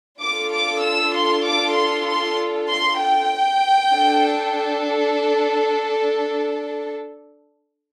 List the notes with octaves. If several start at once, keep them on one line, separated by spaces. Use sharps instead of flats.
D4 F4 A4 D6
D6
E6
C6
D6
C6
C6
C6
G5
D4 A4